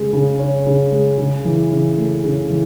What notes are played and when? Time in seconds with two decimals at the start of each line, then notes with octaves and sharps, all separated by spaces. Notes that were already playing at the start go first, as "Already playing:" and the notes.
Already playing: C#3 G#3
0.13 C#3
0.39 C#4
0.66 C#3
0.92 G#3
1.18 C#3
1.45 E3
1.71 C#3
1.97 A3
2.24 C#3
2.50 E3